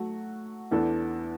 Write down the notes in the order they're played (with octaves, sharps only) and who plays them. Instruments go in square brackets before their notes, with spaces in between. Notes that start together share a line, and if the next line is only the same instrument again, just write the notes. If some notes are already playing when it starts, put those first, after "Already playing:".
Already playing: [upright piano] F#3 A3 F#4
E2 E3 B3 D4 A4